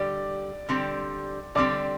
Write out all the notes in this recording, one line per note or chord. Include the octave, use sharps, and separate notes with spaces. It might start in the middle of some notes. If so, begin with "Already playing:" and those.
Already playing: D3 G3 G4 D5 D6
D3 G3 C4 G4
D3 G3 C4 G4 D5 D6